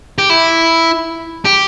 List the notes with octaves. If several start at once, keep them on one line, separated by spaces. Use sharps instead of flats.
G4
E4
G4